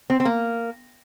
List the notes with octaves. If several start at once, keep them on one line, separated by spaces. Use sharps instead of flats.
C4
C4
A#3